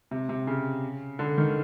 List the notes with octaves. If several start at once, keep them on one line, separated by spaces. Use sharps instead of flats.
C3
C3
C#3
D3
D#3